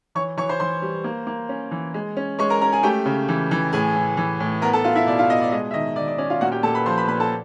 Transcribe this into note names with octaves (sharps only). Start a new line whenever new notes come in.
E3 C#5 C#6
E3 C#5 C#6
C5 C6
E3 C5 C6
G3
A#3
A#3
C#4
E3
G#3
C#4
G#3 C#5 C#6
A#4 A#5
C#4 A#4 A#5
G#4 G#5
A3 G4 G5
C#3
E3
E3
A2 G#4 G#5
A2
E3
A2
B3 A#4 A#5
A4 A5
B3 F4 F5
E4 E5
B2 D5
F4 F5
B2 D#5
D5
G#3 D#5
E5
D#3 D#5
D#3 D5
D5
C#4 D5
F4 F5
A#2 F#4 F#5
G4 G5
A#2 A4 A5
B4 B5
F3 C5 C6
B4 B5
A#2 B4 B5
A4 A5